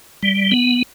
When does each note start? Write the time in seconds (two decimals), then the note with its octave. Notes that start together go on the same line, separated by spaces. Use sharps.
0.23 G3
0.52 B3